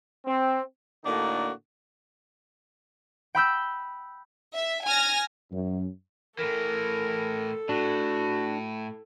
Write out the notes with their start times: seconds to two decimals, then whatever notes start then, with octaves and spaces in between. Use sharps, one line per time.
0.25 C4
1.05 A2 D3 A#3 D4 D#4 F#4
3.35 G5 B5 E6 G6
4.54 E5
4.86 G#5 F6 A#6
5.52 F#2
6.39 A2 E3 A4 A#4
7.69 A2 D4 F#4